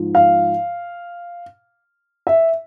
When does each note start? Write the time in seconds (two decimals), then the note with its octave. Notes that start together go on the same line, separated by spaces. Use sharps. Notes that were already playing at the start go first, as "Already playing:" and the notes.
Already playing: G#2 F3
0.15 F5
2.27 E5